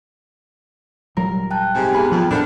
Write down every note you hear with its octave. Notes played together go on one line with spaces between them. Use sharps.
D#1 F#3 G3 A#4
G5 A5 F#6
G#2 C3 G#5
B3 G#4 A#4 B4 G#5
F2 F3 F#3
F2 A2 G#3 B3 D4 A4 A#4 C5